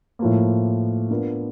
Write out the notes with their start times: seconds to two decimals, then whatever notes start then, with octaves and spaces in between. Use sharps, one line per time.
0.19 A2 F3 A#3
1.10 B3 D4 F4 A#4